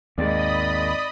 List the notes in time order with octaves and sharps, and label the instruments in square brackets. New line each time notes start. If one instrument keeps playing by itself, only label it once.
[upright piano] G#1 G#3 [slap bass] D#2 [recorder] D5 [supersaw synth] D#5 B5 D#6